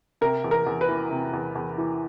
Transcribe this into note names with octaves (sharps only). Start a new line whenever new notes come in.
C3 A#4
E2
A#4
E2
B4
E3
C3
E2
E2
E3